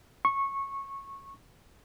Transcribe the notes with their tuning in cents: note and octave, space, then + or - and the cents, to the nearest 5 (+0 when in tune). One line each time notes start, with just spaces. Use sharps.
C#6 -15